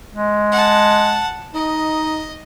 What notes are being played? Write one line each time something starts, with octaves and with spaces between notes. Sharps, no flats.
G#3
F#5 A5
D#4 D#5